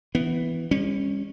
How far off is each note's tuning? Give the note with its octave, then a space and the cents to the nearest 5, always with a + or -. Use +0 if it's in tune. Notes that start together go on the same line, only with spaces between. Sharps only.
E3 +0 B3 +5
G3 +40 C#4 -20